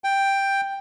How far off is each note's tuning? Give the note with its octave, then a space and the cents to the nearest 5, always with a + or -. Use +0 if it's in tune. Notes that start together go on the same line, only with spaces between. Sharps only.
G5 +5